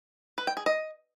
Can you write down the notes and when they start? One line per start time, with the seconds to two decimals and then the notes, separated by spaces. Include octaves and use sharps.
0.38 B4
0.47 G5
0.57 G#4
0.66 D#5